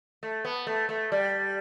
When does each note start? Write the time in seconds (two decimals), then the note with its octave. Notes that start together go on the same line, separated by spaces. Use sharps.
0.23 A3
0.45 B3
0.67 A3
0.89 A3
1.12 G3